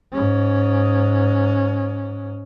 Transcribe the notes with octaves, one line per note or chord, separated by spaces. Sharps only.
G#2 C#4